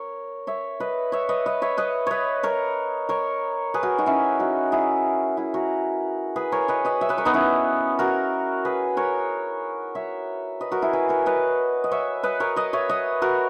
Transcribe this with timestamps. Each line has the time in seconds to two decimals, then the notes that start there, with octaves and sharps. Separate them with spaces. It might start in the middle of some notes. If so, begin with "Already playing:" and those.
Already playing: A#4 C#5
0.47 C#5 E5
0.80 B4 D#5
1.12 C#5 E5
1.29 B4 D#5
1.46 B4 D#5
1.62 C#5 E5
1.77 B4 D#5
2.07 B4 C#5 D#5
2.43 A#4 C#5
3.09 A#4 C#5
3.74 G#4 B4
3.83 F#4 A#4
3.98 D#4 F#4
4.06 C#4 E4
4.39 D#4 F#4
4.72 E4 G#4
5.37 E4 G#4
5.54 F#4 A#4
6.36 G#4 B4
6.52 A#4 C#5
6.68 B4 D#5
6.85 B4 D#5
7.01 C#5 E5
7.09 B4 D#5
7.17 A#4 C#5
7.25 B3 D#4
7.34 C#4 E4
7.99 F#4 A#4
8.65 G#4 B4
8.97 A#4 C#5
9.95 C#5 E5
10.61 B4 D#5
10.72 F#4 A#4
10.82 E4 G#4
10.93 G#4 B4
11.09 A#4 C#5
11.26 B4 D#5
11.84 D#5
11.91 C#5 E5
12.24 B4 D#5
12.40 A#4 C#5
12.56 B4 D#5
12.73 C#5 E5
12.89 B4 D#5
13.22 F#4 A#4